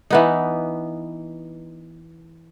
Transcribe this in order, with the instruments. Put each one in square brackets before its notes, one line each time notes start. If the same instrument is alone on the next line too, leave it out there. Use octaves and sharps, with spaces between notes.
[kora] E3 B3 D#4